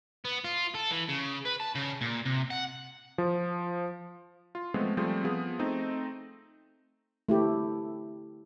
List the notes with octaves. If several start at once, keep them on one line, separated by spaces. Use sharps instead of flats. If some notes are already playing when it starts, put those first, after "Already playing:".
B3
F4
A4
E3
C#3
B4
A5
C#3
A#2
C3
F#5
F3
F4
F3 G#3 A3 B3 C4
F3 G3 A3 C4 G#4 C5
F3 B3 G#4
A3 C4 D#4 D#5
A3 E4 G4